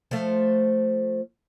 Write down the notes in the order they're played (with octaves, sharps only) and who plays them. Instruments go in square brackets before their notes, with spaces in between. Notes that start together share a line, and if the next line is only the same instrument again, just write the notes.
[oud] F3 A3